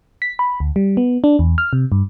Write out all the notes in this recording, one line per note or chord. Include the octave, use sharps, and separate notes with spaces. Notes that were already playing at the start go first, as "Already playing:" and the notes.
B6
B5
D2
G3
B3
D4
E2
F6
C3
G2